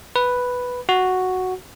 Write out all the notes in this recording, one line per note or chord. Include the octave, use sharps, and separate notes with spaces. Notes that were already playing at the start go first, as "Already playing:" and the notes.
B4
F#4